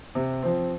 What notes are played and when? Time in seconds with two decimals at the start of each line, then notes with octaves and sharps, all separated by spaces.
0.15 C3
0.43 F3 C4